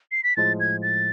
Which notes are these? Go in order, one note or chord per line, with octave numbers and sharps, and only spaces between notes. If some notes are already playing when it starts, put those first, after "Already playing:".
C7
B6
A2 F3 G#3 A6
G#6
A6